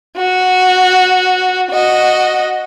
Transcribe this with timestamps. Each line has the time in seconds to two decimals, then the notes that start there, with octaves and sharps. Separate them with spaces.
0.17 F#4
1.71 F#4 D#5